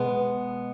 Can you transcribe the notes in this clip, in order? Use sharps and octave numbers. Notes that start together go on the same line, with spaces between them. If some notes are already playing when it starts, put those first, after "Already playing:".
Already playing: B2 G#3 B3